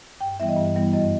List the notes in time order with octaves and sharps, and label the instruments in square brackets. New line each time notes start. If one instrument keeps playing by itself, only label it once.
[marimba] G2 G5
E3 G3 B3 E4 E5
D#5
G2
E3 G3 B3 E4
F#2 D#5